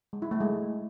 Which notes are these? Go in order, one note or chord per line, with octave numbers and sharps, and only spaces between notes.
G#3
E4
A3
G#3